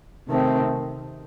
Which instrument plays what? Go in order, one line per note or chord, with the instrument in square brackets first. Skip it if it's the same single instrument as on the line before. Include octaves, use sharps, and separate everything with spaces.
[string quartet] C3 D#3 A3 C4